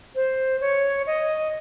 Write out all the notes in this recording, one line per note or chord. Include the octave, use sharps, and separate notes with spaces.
C5
C#5
D#5